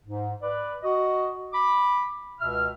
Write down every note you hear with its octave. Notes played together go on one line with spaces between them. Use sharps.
G#2
B4 D5
F#4 D#5
B5 D6
C#2 B2 E5 F6